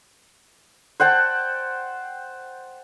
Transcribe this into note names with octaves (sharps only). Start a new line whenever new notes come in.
C5 F#5 G5 A5